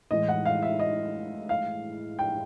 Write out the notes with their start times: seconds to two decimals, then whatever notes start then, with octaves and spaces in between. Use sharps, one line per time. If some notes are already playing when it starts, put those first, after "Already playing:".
0.11 A2 E3 G#3 D#5
0.28 F#5
0.46 F5
0.62 E5
0.79 D#5
1.49 F5
2.19 G5